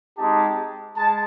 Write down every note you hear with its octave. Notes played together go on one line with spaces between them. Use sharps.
G#3 C4 D#4 G4 A5
G#3 A5